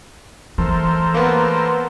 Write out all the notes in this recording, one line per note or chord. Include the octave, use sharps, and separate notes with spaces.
E3 A3 A4 A#4 C5
A#3 B3